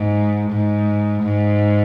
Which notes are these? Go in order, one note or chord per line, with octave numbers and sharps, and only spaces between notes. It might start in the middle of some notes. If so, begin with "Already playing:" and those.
Already playing: G#2
G#2
G#2